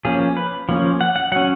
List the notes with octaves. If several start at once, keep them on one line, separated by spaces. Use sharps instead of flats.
F3 A#3 C#4 G#4
B4
F3 A#3 C#4
F#5
F#5
F#3 C#4 F#5